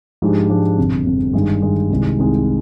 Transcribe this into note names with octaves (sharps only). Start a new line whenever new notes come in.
G#2 F3 G#3 D4 G4
G#2 F3 G#3 D4 G4
G1 F2 C3
G1 F2 C3
G2 D#3 G#3
G2 D#3 G#3
C2 C3 D#3 G#3
C2 C3 D#3 G#3